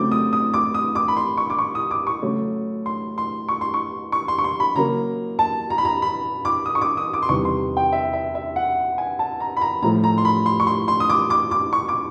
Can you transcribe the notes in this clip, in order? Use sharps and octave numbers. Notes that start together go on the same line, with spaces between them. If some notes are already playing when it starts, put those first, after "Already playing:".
Already playing: C#3 F#3 A3 C4 D6
D#6
D#6
D6
D#6
D6
B5
C6
C#6
D6
C#6
D#6
D6
C#6
C#3 F#3 A3 C#4
C6
C6
C#6
C6
C#6
C#6
C6
C#6
C6
B5
C#3 F#3 A#3 A#5
A5
A#5
B5
A#5
B5
D6
D#6
C#6
D6
D#6
D6
C6
E2 C3 D#3 G3 C#6
C6
G5
E5
E5
E5
F#5
G#5
A5
A#5
B5
A#5
A2 F3 A3 A#5
A#5
C6
B5
C6
C#6
C6
C6
D#6
D6
D6
D6
C#6
D6